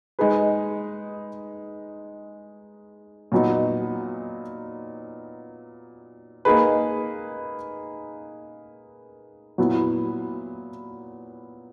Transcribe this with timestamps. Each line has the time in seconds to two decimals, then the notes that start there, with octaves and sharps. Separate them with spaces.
0.19 G#3 D#4 G#4 B4
3.32 A#2 F#3 B3 D#4
6.45 A#3 D#4 G#4 B4
9.58 A#2 F#3 B3 E4